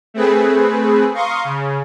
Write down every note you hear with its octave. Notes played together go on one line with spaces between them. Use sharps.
A3 C4 G#4 B4
F5 A#5 C6 C#6 D#6
C#3